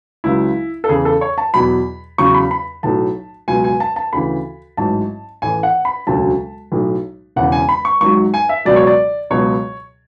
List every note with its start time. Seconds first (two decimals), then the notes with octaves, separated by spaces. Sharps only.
0.24 C#2 C#3 F#3 E4
0.84 A4
0.89 E2 C#3 E3 G#4
1.05 A4
1.21 C#5
1.38 A5
1.54 E2 B2 F#3 B5
2.18 E2 C#3 F#3 C#6
2.34 B5
2.51 B5
2.83 B1 A2 F#3 A5
3.48 C#2 B2 F#3 G#5
3.64 G#5
3.80 A5
3.96 A5
4.13 D2 C#3 E3 B5
4.77 A1 G#2 F#3 A5
5.42 A1 A2 E3 G#5
5.63 F#5
5.85 B5
6.07 E1 D2 C#3 F#3 A5
6.72 B1 A2 F#3
7.36 E1 E2 C#3 E3 F#5
7.52 G#5
7.69 B5
7.85 C#6
8.01 G#1 G#2 F#3 C#6
8.34 G#5
8.49 E5
8.65 C#2 B2 F#3 D5
8.76 C#5
8.87 D5
9.30 C#2 B2 F#3 C#5